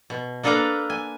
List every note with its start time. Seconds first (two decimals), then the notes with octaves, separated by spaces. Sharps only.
0.10 B2
0.43 A#3 D4 A4 B4 F5 A#5
0.90 G#5